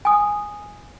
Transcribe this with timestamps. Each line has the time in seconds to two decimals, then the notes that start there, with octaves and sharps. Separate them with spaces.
0.05 G#5 D#6